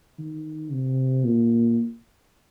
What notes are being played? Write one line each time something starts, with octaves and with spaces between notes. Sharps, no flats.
D#3
C3
A#2